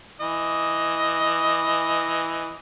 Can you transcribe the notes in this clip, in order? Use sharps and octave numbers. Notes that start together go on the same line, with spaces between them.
E3 D#5